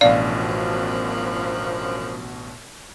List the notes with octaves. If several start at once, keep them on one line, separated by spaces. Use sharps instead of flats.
A1 F#2 B2 F3 D4 D5 F5